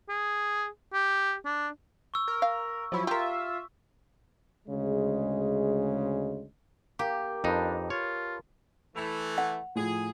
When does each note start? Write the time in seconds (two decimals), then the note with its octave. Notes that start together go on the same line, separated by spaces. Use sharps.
0.09 G#4
0.93 G4
1.46 D4
2.14 C#6 E6
2.28 A#4
2.42 F5
2.92 F3 F#3 E4
3.07 F4 G4 A#4 E5
4.68 D2 C#3 G#3
6.99 A#3 G4
7.44 F2 D4 D#4 A#4 B4 A5
7.90 F4 C#5
8.96 E3 A3 F7
9.38 F#5
9.75 A2 F3 G#4